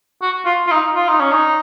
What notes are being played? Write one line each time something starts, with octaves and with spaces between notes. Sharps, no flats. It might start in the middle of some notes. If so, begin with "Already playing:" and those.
F#4
F4
F4
D#4
F4
D#4
C#4
D#4